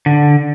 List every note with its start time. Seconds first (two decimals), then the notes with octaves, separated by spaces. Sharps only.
0.06 D3